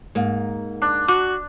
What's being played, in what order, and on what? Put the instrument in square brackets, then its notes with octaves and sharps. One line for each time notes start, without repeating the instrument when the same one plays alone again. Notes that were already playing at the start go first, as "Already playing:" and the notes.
[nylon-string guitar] G#2 A#3
[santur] D4
[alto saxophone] F#4 [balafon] D6